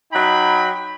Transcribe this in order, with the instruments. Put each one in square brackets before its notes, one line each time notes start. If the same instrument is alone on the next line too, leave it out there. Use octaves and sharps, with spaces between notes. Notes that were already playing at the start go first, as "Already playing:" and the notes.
[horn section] F#3 D#4 G5 B5